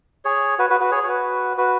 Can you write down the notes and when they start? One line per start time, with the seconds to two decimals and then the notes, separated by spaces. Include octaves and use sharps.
0.25 G#4 C#5
0.59 F#4 B4
0.70 F#4 B4
0.80 F#4 B4
0.91 G#4 C#5
1.03 C#5
1.08 F#4 B4
1.58 F#4 B4